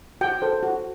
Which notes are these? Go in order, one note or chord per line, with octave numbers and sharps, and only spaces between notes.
F#4 G5
A4 C5
F#4